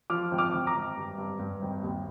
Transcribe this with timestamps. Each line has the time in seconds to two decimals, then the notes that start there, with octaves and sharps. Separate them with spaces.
0.10 F3 D6 F6
0.31 G#1
0.38 D6 F6
0.53 G#1
0.67 A#5 D6
0.74 G#1
0.96 G2
1.18 G2
1.39 G2
1.62 G#1
1.83 D#2